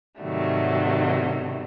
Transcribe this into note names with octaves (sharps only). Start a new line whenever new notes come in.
G#2 C3 D#3 F#3 G3 A3